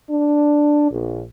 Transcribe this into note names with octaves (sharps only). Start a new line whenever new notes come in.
D4
A#1